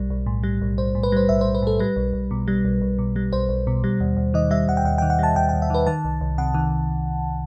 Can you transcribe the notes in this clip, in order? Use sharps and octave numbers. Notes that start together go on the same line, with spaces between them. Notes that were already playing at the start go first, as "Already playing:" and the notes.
Already playing: B1 G3
B1
A2
G3
B1
B1 C5
A2
B4
G3 C5
B1 E5
B1 C5
B4
A2 A4
G3 B4
B1
B1
B2
G3
B1
B1
B2
G3
B1 C5
B1
B2
G3
D#2
D#2
D#3 D#5
G3 E5
D#2 F#5
G5
D#2 F#5
D#3 G5
F#5
G3 A5
D#2 G5
D#2 G5
E5
D#3 B4
D#3 A5
C2
C2
C3 F#5
D#3